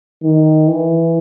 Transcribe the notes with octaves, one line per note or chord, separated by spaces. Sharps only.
D#3
E3